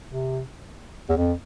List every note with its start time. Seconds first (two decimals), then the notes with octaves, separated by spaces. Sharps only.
0.08 C3
1.10 E2
1.17 F2